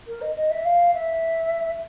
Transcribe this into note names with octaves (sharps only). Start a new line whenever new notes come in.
A#4
D#5
D#5
E5
F5
E5